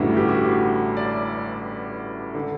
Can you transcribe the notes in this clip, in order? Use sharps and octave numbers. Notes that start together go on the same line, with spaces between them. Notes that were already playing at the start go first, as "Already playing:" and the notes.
Already playing: A1 G2 D3 E4 F#4 G4
G4
F#4
D5
D3